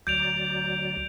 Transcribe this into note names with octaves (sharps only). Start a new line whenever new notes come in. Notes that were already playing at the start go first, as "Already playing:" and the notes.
D2 F#3 D5 G6 D7 F7